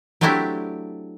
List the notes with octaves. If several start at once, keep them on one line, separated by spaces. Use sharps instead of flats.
F#3 A3 C4 D4 E4 G4